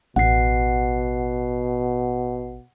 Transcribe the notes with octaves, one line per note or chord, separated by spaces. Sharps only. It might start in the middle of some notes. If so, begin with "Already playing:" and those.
A1 B2 F#5 C7